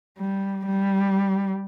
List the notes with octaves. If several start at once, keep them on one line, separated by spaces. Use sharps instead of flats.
G3
G3